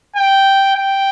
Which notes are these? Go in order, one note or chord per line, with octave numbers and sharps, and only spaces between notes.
G5
G5